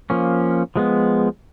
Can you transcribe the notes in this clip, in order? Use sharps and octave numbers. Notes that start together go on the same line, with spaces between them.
F3 A#3 C#4
F3 G#3 B3